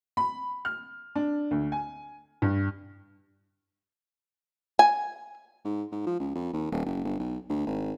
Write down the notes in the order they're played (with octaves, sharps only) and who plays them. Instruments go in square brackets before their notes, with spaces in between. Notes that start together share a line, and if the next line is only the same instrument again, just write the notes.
[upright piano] B5
F6
D4
D2
G#5
G2
[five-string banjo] G#5
[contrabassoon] G#2
G#2
F3
C#2
F2
D#2
D#1
F#1
G1
B1
D2
G#1